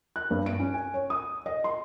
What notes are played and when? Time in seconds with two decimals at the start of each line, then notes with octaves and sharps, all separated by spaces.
0.16 F#6
0.31 G2
0.46 D7
0.59 C#4
0.74 G#5
0.94 C#5
1.10 D#6
1.46 D#5
1.64 C6